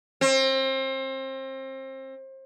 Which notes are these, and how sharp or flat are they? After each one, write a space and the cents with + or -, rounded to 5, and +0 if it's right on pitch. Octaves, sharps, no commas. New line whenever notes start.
C4 +30